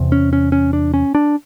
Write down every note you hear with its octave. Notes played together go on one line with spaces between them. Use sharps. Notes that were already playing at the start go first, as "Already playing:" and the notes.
Already playing: E2 C3
C#4
C#4
C#4
D4
C#4
D4